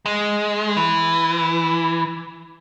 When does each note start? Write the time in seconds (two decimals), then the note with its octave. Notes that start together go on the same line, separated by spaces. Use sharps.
0.06 G#3
0.77 E3